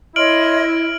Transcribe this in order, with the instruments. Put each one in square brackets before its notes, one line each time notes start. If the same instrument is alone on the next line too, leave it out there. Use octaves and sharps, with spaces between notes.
[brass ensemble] E4 [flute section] C#5 D#5 C6 [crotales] F6 D7 F#7